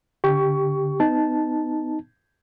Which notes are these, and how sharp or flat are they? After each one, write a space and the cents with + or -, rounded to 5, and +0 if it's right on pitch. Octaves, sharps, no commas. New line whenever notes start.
D3 -25 G4 +0 C#6 +20
B3 +35 D#4 +0 A5 -10